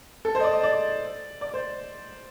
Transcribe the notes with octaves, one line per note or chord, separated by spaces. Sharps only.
A4
C5
D#5
D5
D#5
D5
D5
C5